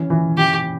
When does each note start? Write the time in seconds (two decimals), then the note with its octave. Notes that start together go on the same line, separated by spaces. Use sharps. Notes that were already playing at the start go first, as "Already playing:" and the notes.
Already playing: E3 C#4
0.10 E3
0.38 E3 G4